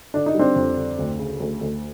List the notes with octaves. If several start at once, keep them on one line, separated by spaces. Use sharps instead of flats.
D3 D4
D#4
G3 C4 D4
F2
D3
D2
C#3
D2
D2